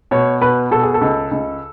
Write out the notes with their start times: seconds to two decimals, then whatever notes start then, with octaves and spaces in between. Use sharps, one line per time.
0.11 B2 C#5
0.41 B2 B4
0.71 B2 A4
0.82 G#4
0.94 A4
1.01 C#2
1.31 C#2